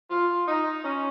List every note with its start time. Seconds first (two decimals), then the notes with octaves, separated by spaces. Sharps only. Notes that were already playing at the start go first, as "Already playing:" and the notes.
0.10 F4
0.48 D#4
0.83 C#4